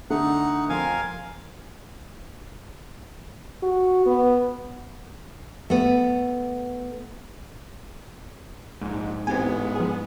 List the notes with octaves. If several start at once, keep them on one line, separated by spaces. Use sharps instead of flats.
D3 A3 D#4 F#5
F2 A#4 F5 G#5 C6
F#4
B3
A3 B3
A#1 G#2
A1 B3 C4 G4 G#5
F3 G#4